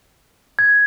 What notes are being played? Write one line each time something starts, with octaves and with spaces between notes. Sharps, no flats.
G#6